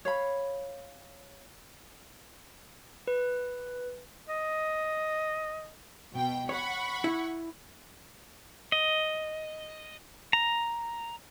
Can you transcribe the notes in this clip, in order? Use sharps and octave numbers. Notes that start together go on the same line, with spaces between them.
C#5 F5 B5
B4
D#5
B2 G5
C#5 F#5 B5 C#6
E4
D#5
A#5